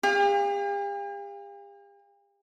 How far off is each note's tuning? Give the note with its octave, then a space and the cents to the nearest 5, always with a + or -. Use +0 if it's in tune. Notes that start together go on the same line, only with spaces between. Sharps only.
G4 +45 F5 +0